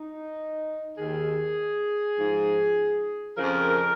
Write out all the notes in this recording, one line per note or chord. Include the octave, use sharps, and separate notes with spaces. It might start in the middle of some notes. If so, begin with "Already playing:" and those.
Already playing: D#4
D#2 D#3 G#4
G#2 F3
F2 C#3 F3 A#4